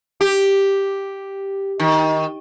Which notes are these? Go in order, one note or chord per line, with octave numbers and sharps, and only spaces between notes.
G4
D#3